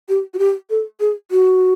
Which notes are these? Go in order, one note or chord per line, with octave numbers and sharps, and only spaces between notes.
G4
F#4
G4
A4
G#4
F#4